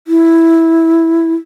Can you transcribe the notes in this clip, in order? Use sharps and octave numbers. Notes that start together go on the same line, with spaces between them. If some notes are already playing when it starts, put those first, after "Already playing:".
E4